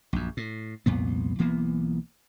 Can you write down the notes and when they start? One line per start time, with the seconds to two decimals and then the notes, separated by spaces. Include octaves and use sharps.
0.13 A#1 F#2
0.37 A2
0.86 C2 F2 A#2 B3
1.39 B1 E3 A#3 B3